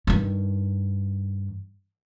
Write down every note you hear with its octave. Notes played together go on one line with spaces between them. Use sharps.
G2 D#3